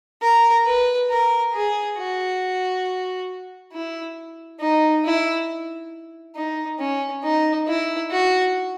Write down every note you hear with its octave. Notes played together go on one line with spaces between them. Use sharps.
A#4
B4
A#4
G#4
F#4
E4
D#4
E4
D#4
C#4
D#4
E4
F#4